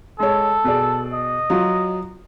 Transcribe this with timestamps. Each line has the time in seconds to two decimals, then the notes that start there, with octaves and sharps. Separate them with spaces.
0.20 G#3 A4 C#5
0.64 B2 G#4 D5
1.13 D#5
1.50 F#3 F4